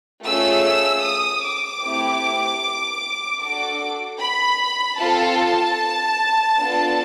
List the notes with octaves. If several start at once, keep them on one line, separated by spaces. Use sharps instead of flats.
A3 C#4 F4 G#4 E6
D#6
D6
A3 C4 E4 G4
D4 F#4 A4 D6
B5
C4 F4 A4 A5
B3 D4 F4 A4